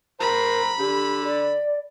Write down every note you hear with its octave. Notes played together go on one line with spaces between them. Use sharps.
A#4 C5 A#5 B5
D3 G4
D5